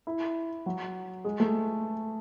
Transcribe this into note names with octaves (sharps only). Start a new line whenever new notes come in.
E4
F#3
G#3
A3